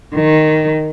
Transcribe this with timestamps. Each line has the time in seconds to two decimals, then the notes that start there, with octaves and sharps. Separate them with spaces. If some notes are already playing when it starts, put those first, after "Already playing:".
0.15 D#3